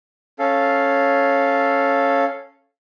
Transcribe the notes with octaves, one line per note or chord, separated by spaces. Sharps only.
C#4 A4 F5